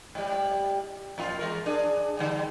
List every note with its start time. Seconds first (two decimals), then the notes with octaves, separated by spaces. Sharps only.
0.15 G#2 G3
1.18 F2 A#2 F4
1.39 E2 G#3 A#4
1.66 D4 G#4
2.17 D3 G3 D4